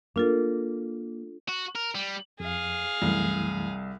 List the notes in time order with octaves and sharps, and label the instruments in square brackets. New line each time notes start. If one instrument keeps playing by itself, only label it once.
[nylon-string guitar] A#3 [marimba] D4 F4 A4
[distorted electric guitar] F#4
A#4
G3
[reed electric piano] F2 [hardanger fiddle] G#4 F5
[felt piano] C2 [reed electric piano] F#2 E3 A3